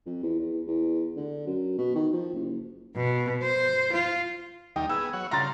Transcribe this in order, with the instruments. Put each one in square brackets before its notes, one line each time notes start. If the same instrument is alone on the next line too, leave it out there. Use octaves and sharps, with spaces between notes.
[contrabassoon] F2
E2
E2
E2
D3
F#2
B2
D#3
F3
F#1
[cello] B2
C5
F4
[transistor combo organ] D#2 G3 D#4 [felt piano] G5
[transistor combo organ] B3 G#4 [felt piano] E6
[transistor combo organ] F#3 C#5 F#5
[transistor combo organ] C#3 G3 F4 [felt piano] A#5 C6 A6